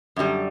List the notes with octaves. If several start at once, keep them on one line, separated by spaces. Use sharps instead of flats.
F#2 D3 G3